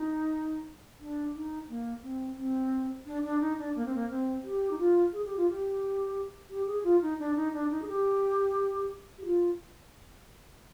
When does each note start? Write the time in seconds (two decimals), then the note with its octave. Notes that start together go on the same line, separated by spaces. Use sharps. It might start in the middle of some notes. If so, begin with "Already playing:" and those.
Already playing: D#4
1.00 D4
1.35 D#4
1.69 A#3
2.03 C4
2.38 C4
3.06 D4
3.24 D4
3.41 D#4
3.58 D4
3.76 A#3
3.85 C4
3.95 A#3
4.09 C4
4.44 G4
4.71 D#4
4.78 F4
5.13 G#4
5.25 G4
5.37 F4
5.50 G4
6.50 G4
6.67 G#4
6.84 F4
7.02 D#4
7.19 D4
7.36 D#4
7.53 D4
7.71 D#4
7.82 G#4
7.87 G4
9.18 G4
9.25 F4